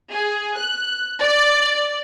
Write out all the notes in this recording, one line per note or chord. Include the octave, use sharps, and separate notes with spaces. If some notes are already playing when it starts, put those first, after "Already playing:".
G#4
F#6
D5